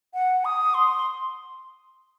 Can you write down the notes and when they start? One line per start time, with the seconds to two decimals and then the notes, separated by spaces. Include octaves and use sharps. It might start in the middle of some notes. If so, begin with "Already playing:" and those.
0.14 F#5
0.45 D#6
0.74 C6